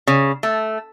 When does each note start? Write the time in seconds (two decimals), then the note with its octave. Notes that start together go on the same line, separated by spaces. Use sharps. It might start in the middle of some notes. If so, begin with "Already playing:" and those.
0.07 C#3
0.43 A3